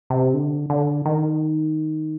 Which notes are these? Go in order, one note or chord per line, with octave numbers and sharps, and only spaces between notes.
C3
D3
D3
D#3